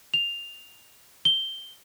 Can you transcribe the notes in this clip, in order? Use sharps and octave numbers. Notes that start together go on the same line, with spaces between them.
F7
G7